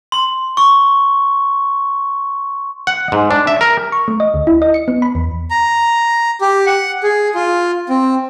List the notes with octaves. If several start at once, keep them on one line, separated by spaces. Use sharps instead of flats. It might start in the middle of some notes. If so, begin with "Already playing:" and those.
C6
C#6
F#5
G#2
D4
E5
A#4
C#6
A3
D#5
D2
E4
D#5
C#7
B3
B5
E2
A#5
G4
F#5
G#4
F4
C4